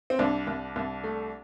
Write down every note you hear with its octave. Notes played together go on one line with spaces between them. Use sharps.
C4
C2 D4
C2
C2
A3